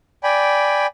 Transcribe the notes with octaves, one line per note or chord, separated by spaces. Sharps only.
D5 G5 G#5 B5